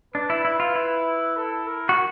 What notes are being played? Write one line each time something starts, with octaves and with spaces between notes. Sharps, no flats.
D4 B4
E4
E4
F4
E4
A4
A#4
F#4